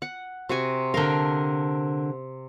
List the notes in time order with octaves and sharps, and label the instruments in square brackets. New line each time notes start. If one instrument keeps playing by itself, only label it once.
[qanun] F#5
C3 F#4 G#5
[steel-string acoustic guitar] D3 A#4 [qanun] F5 G5